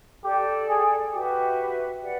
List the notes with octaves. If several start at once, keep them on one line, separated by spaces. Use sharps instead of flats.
G4 A4 D5 G5
G#4
F#4 G4 B4 E5
G4 B4 D5 F#5